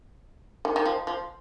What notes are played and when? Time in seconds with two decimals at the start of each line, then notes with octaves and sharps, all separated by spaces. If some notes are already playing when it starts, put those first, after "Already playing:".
0.65 D#3
0.76 D#3
0.86 F3
1.07 F3